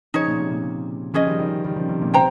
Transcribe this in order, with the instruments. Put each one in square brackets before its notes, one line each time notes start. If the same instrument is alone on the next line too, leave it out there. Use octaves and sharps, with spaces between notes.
[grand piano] C#3 F3 [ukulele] D#4 G#4 C#5
[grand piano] A#2
C3
A#2 C#3
[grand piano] C#3 F3 [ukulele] C#4 G#4 D#5
[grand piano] D#3 G3
D#3 G3
D#3 G3
C#3 F3
C3 D#3
A#2 C#3
[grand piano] C3 [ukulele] C5 G5 A#5